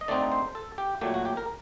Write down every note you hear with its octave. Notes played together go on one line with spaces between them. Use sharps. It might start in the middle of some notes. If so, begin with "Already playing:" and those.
D#5
D3 A3 C4 D#4 D5
C5
A4
G4
A#2 F#3 A3 G4
F#4
G4
A#4